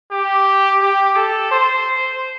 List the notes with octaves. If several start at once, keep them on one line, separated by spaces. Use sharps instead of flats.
G4
G4
A4
C5